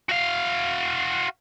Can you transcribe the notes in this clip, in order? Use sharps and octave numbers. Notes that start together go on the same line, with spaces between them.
F#4 F5